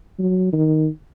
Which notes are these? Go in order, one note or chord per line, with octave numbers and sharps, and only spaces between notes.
F#3
D#3